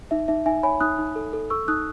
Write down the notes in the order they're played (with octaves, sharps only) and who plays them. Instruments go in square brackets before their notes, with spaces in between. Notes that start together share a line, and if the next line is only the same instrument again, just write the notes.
[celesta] D#4 E5
D#4 E5
D#4 E5 G#5
C#5 G#5 B5
D#4 D#6 F#6
D#4
A4
A4
A4 C#6 E6
D#4 D#6 F#6